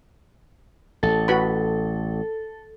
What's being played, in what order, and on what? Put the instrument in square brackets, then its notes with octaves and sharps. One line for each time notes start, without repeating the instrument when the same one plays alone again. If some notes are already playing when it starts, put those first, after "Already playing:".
[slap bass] A1 [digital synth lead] A4
[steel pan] F#4 B4 B5